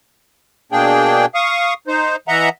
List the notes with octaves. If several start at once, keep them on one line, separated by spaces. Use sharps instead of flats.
B2 A#3 D4 G#4 G5
F5 C#6 D#6
D#4 C5
E3 D#5 E5 F#5 A#5